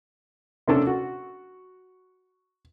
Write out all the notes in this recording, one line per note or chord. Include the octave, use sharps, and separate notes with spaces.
C3 A#3 C#4 D4 A4
F#4